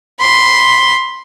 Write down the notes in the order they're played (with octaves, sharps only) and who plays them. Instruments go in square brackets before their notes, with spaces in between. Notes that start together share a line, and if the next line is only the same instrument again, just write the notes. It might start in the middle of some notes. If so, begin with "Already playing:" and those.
[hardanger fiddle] B5 C6